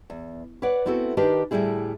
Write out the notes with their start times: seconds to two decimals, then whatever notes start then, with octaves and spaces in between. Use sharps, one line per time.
0.10 E2
0.62 B4 C#5 D5 F#5
0.85 A3 B3 C4 E4 F#4 A4
1.17 D#3 D4 G4 A#4 B4
1.51 D2 A2 C3 G3 E4 G#4